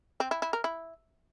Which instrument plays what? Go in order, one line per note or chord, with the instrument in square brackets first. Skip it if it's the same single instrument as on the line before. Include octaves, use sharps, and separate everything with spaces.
[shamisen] C4
E4
E4
A#4
E4